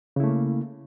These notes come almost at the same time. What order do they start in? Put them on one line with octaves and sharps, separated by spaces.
C#3 E4 A3 A#3